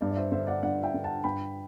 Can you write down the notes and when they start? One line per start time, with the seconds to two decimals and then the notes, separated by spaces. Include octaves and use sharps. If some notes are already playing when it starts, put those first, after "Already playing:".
0.01 G2 D5
0.11 D5
0.16 C5 E5
0.32 D3 C5 E5
0.47 D5 F#5
0.63 G2 D5 F#5
0.83 E5 G5
0.94 D3
1.04 F#5 A5
1.24 G2 G5 B5